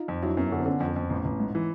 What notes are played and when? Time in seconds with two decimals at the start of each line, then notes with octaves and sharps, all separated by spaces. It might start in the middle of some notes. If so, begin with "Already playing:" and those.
Already playing: D#4 F4
0.08 F2
0.22 F#3 D4 E4
0.37 F#2 B3 C#4
0.52 D3
0.59 C4
0.66 D3 B3 C#4
0.80 F2
0.96 F2
1.10 A1
1.25 A1
1.40 G#2
1.55 E3